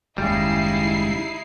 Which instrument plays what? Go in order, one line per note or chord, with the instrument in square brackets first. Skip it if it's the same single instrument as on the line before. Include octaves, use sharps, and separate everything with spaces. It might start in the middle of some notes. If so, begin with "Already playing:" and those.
[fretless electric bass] F#1 D#2 [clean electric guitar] C#3 G3 [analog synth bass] G#3 [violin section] D#4 E4 C7